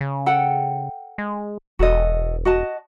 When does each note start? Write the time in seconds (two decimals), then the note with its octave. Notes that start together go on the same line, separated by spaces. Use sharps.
0.01 C#3
0.26 A4 F#5 G5
1.18 G#3
1.79 E1 F#4 A4 D#5
2.45 F#4 D#5 A5